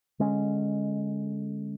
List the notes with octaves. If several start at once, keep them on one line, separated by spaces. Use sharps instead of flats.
D3 G#3 C#4